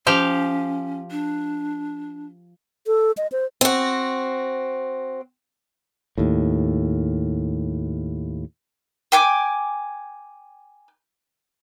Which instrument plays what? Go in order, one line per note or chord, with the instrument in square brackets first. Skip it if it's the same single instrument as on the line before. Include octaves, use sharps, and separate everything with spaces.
[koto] F3 G4 F5 [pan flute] C#4
[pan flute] D4
[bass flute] A4
D#5
C5
[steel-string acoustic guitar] C4 F#4
[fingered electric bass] D#2 A2
[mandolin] G5 G#5 D6